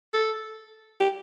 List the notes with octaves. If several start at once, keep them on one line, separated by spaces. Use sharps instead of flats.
A4
G4